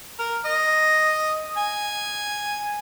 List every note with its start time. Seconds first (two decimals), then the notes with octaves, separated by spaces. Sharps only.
0.19 A#4
0.46 D#5
1.57 G#5